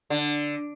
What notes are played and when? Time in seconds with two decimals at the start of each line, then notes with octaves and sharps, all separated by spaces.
0.10 D3